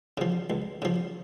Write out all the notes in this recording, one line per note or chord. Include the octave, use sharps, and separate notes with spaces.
C#3 F3
C#2
C#3 F3